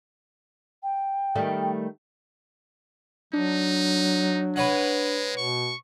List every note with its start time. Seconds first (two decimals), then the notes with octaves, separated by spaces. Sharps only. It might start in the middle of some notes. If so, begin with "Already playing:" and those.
0.83 G5
1.35 D#3 G3 A3
3.33 F#3 D4 D#4
4.56 G#3 B4 C#5 F#5
5.37 B2 C#6